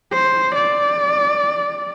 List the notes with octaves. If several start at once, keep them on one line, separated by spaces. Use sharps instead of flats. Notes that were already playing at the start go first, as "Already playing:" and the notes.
C5
D5